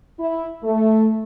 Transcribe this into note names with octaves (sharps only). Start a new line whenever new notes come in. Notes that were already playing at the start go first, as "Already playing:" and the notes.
E4
A3